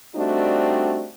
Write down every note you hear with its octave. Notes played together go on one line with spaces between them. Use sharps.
G3 A3 C4 D4 D#4 F#4